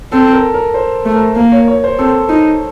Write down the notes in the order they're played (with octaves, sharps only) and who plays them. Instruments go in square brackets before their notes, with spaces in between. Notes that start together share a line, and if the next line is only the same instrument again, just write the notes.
[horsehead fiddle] C4 [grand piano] A4
[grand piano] A#4
A#4
C5
[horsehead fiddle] A3
[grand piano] A#4
[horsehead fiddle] A#3 [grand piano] A#4
[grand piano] C#5
C#5
C5
[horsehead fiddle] C4 [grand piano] A4
[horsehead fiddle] D#4